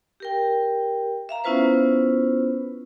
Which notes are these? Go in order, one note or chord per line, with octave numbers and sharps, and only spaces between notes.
G4 A#4 G5
E5 F5 A#5
B3 C#4 E4 F4 B4 C5